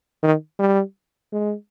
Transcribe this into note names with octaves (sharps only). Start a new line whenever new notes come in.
D#3
G3
G#3